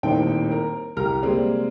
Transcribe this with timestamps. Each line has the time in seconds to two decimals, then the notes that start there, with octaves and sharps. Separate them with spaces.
0.03 D#1 D#2 A2 D#3 C4 G5
0.51 A#4
0.96 C2 G4 A#4 A#5 F6
1.23 C3 G3 G#3 A#3 C4